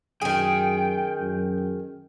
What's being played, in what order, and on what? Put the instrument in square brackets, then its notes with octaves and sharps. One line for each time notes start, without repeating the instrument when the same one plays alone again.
[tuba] F#2 [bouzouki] D#3 G#4 [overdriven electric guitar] G5
[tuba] F#2